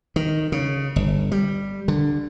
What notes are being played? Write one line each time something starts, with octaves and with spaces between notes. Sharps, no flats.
D#3
C#3
G1
G3
D3